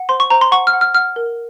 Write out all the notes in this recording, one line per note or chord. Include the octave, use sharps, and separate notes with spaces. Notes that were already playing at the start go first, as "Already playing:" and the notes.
Already playing: F#5
C5 C6
C#6
C5 A#5
C6
F#5 C#6
F6
F#5
F6
F#5 F6
A#4